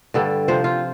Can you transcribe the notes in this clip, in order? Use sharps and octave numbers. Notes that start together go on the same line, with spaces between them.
G2 D3 G3 A4
C3 F3 C5
F4